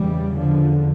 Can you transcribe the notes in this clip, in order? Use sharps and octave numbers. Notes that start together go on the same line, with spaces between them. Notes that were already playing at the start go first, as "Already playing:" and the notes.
Already playing: E2 C#3 E3 G3
D3 F3